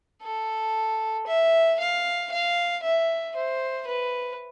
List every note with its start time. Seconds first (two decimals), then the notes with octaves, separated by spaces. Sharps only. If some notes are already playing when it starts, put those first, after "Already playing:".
0.23 A4
1.27 E5
1.80 F5
2.32 F5
2.84 E5
3.36 C5
3.88 B4